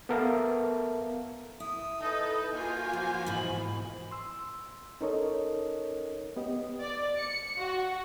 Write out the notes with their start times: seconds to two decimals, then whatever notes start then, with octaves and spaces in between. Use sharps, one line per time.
0.09 B3 A4 A#4 E5 F5 A5
1.60 E4 D#6
2.01 D#4 A4 B4 D#5
2.54 A#3 F4 F#4 G#5 G6
2.93 F3
3.26 G#2 B2 E3 B5
4.11 C6 E6
5.01 C#4 D#4 A4 A#4 C#5 D#5
6.36 B3 G4 D#5
6.81 D5
7.18 C#7
7.60 F#4